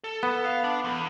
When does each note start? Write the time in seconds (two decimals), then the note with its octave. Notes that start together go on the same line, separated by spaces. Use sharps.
0.04 A4
0.23 B3
0.45 F5
0.64 D4
0.84 E2